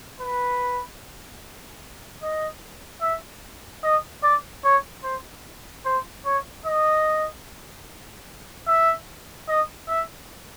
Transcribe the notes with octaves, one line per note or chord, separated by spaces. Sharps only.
B4
D#5
E5
D#5
D5
C#5
C5
C5
C#5
D#5
E5
D#5
E5